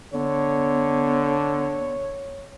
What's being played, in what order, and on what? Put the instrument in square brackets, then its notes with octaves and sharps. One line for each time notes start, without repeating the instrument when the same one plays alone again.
[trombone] D3 [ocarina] B3 [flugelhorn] C#5